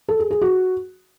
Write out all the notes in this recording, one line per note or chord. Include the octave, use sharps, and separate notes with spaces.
A4
G#4
G#4
F#4